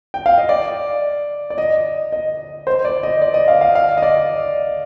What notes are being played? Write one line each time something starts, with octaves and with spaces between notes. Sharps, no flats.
G5
F5
D#5
D5
D5
D#5
D#5
C5
D5
D#5
D5
D#5
F5
F5
F5
D#5
D5